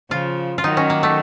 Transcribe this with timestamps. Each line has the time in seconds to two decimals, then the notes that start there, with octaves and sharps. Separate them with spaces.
0.11 C#3 F3 F4
0.58 F4
0.64 D#3 F#3 D#4
0.77 C#4
0.90 A#3
1.03 A3